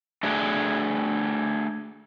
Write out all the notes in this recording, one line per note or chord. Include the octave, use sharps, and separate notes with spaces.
A3 D4 F#4 G#4